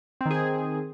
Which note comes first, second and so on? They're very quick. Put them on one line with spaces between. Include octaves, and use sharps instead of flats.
C4 D#3 G#4